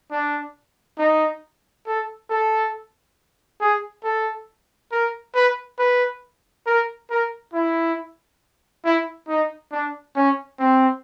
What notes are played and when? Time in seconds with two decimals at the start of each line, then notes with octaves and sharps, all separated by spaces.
0.11 D4
0.98 D#4
1.87 A4
2.30 A4
3.61 G#4
4.04 A4
4.92 A#4
5.35 B4
5.79 B4
6.66 A#4
7.10 A#4
7.54 E4
8.85 E4
9.28 D#4
9.72 D4
10.16 C#4
10.59 C4